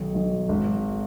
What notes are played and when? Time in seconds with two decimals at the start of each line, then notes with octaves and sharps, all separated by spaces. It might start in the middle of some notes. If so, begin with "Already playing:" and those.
Already playing: B1 D#3
0.15 B1
0.49 G#1